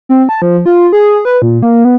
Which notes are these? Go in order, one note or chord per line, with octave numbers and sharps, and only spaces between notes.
C4
A5
F3
F4
G#4
B4
A#2
A#3
B3